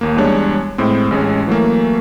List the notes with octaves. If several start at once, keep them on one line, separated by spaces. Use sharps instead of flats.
D#2 A#3
E2 G3 G#3 D4 C#5
A2 G#3 C4
A1 G#3 C#4
E3 F#3 A3 A#3